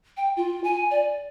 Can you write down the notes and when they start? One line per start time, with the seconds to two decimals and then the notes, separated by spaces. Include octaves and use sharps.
0.17 G5
0.37 F4
0.64 G#5
0.91 D5